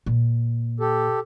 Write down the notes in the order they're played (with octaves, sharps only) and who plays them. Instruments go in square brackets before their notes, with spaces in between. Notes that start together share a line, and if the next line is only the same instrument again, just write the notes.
[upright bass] A#2
[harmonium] G4 A4